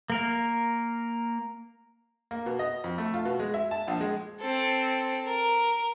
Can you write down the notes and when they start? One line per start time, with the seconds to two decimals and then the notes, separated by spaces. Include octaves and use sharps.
0.10 A#3 A#4
2.31 A#3
2.46 B2
2.59 D#5
2.84 F2
2.98 A3
3.14 F4
3.25 B2
3.39 G#3
3.54 E5
3.71 A5
3.87 A#1
4.00 G#3
4.40 C4 A4
5.26 A#4